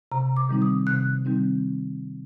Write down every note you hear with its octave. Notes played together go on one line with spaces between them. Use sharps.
C3 A#5
D6
D#3 G3 C4 D#4
D#6
C3 F#6
D#3 G3 C4 D#4